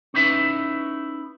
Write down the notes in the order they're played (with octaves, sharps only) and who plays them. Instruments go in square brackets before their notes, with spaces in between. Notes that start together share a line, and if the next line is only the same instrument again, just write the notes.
[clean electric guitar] C#4 D#4 E4 B4 E5